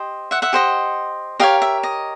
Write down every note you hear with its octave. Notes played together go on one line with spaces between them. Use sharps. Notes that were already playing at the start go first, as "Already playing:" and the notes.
Already playing: G4 C5 D#5
E5 F#5
E5 F#5
G4 C5 D#5
G4 A#4 C#5 D#5 F5
E5
D#5